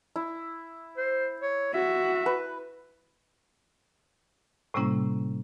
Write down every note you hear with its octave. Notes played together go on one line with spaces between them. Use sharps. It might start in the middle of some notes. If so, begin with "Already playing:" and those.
E4
C5
C#5
F#4 E5
B4
A2 C3 G3 A#3 C#4 E4